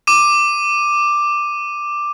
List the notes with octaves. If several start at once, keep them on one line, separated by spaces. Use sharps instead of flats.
D6 D#7